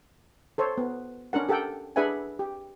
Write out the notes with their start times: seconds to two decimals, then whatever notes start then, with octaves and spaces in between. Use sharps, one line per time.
0.58 A4 C5 C#5
0.78 B3
1.33 C#4 D4 A#4 F#5
1.49 G4 A4 A#4 F#5 G5
1.96 D4 G#4 B4 E5 F#5 G#5
2.39 G4